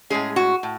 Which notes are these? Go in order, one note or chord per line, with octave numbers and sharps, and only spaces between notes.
A2 G#3 C#4 G#4
F#4
A2